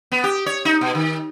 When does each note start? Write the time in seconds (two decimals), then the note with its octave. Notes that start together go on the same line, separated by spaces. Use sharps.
0.12 B3
0.24 G4
0.46 C#5
0.65 D#4
0.81 B2
0.95 D#3